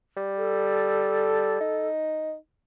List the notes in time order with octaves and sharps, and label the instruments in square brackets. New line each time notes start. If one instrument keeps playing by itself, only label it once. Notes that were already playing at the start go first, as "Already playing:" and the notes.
[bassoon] G3
[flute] A4
[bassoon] D#4